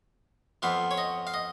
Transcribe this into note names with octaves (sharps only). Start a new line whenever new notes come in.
F2 F3 B3 F5
C#5
D#5
F5
D#5